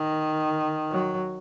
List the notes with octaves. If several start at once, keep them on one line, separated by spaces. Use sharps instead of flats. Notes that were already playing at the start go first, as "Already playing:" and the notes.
Already playing: D#3
F#3